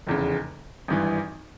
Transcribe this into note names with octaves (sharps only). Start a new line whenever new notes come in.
F1 E2 C#3
G#1 G2 E3